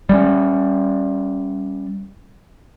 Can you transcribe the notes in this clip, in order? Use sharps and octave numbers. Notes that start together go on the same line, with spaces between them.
G3 G#3 C#4